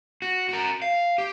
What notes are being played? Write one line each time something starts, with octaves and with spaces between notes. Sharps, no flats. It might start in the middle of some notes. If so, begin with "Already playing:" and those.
F#4
F#4 A#4
F5
G4